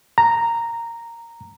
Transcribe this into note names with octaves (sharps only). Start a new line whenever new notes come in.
A#5